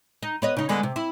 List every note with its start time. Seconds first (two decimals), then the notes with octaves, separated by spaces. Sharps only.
0.23 D#4
0.42 B3 C#5 D#5
0.57 C#3 D#4
0.69 D3 G#3 B3
0.83 C3
0.96 E4